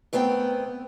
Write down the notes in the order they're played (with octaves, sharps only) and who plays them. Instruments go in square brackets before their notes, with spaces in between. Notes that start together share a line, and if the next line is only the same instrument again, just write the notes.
[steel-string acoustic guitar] A#2 A3 B3 C4 A4 G5